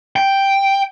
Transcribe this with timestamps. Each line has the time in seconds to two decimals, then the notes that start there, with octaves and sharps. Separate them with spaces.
0.16 G5